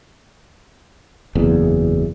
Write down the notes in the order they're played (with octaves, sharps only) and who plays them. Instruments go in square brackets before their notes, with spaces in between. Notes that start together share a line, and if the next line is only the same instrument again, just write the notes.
[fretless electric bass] F#1 E2